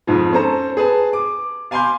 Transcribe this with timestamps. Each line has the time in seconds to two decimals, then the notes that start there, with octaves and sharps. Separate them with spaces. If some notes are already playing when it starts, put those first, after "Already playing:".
0.07 F2 G#2 F3
0.32 C#4 A4 C5 A#5
0.77 G#4 B4 A5
1.13 D6
1.71 F5 G#5 B5 C6 D6 G6